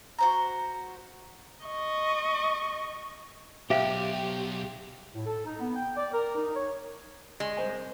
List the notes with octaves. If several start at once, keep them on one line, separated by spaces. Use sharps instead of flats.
F#4 C5 A#5
D#5 C#6
B1 G4 C5 E5 F5
A2
A4
D#4
B3
G5
D5
A#4
D#4
C#5
G#3
C2 C5 G#5